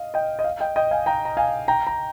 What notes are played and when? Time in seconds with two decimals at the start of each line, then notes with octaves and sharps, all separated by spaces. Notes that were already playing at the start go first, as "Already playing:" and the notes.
Already playing: D#5 F5
0.14 D#5 G5
0.39 D#5
0.44 F5
0.60 D#5 G5
0.76 D#5 G5
0.91 F5 G#5
1.06 G5 A#5
1.25 A#5
1.37 F5 G#5
1.68 G5 A#5
1.87 A#5